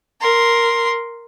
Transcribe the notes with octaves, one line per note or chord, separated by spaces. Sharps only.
A#4 C6